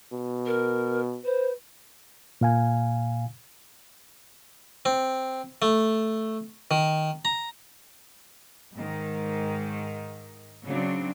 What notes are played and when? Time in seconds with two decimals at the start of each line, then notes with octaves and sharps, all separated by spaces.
0.13 B2
0.46 A#4
1.25 B4 C5
2.41 A#2 F5 G#5
4.85 C4
5.62 A3
6.71 D#3
7.25 A#5
8.74 G#2 D#3
10.65 C#3 F#3 C4 D4